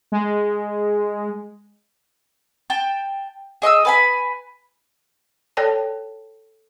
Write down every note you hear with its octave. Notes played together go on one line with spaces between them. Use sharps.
G#3
G5 A5
G#4 D#5 C#6 E6
B4 G#5 B5
A4 C#5 D5 G5 A5